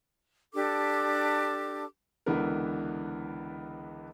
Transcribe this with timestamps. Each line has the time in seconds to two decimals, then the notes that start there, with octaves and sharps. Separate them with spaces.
0.54 D4 G4 A4 D6
2.26 C#2 D3 E3 B3 A#4